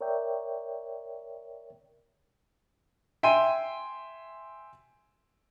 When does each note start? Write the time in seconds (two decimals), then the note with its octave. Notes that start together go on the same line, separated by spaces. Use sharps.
0.01 A#4 C#5 D5 E5 G5
3.23 E5 G5 G#5 C6 D#7